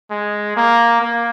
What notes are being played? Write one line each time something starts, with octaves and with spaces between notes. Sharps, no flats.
G#3
A#3
A#3